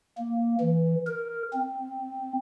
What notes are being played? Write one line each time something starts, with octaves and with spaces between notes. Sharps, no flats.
A#3
E3
A#4
C4